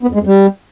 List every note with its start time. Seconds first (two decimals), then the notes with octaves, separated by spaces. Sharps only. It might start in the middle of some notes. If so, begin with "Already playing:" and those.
0.03 B3
0.09 F2
0.15 G#3
0.21 F2
0.27 G3